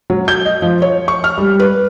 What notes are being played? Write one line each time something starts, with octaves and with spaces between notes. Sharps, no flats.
F#3
G6
D#5
F3
C#5
C#6
F6
G3
B4